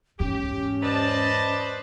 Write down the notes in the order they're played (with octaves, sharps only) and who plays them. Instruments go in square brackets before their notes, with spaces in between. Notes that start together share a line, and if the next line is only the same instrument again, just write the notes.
[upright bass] E2 G#2 [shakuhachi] C#4 [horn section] G4
[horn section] B4 C5 [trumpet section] D5 D#5 A5